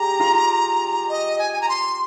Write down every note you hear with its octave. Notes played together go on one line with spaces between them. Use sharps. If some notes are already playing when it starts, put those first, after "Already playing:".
Already playing: G4 G#4 A#5
F4
D#5
G#5
G#5
A#5
C6